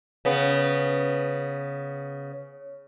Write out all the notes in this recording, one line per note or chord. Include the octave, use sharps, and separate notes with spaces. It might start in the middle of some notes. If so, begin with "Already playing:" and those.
C#3 B3